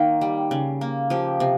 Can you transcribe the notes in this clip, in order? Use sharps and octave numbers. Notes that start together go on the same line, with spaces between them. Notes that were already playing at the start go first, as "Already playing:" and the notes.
Already playing: D#3 A#3
G3
C#3
A#3
F3 G4
C3